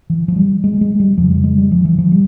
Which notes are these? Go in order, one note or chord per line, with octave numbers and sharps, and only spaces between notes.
E3
F3
G3
G#3
G#3
G3
F2 C#3 F3
G3
G#3
G3
F3
E3
F3
G3